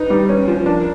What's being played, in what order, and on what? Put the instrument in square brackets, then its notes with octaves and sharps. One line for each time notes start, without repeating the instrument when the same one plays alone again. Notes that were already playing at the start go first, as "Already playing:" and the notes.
Already playing: [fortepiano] D#4 [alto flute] B4
[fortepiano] G3
C#4
F3
[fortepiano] D4 [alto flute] A#4